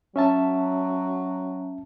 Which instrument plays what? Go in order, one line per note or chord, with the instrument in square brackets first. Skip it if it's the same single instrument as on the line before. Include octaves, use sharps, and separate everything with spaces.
[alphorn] F#3 [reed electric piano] C#4 E5 A5